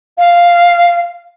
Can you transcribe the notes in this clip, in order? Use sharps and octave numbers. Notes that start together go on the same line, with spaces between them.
F5